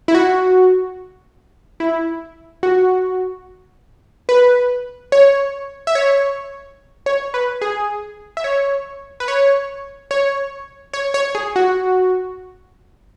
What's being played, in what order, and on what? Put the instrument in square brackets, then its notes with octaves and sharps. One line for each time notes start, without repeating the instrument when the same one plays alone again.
[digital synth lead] E4
F#4
E4
F#4
B4
C#5
E5
C#5
C#5
B4
G#4
E5
C#5
B4
C#5
C#5
C#5
C#5
G#4
F#4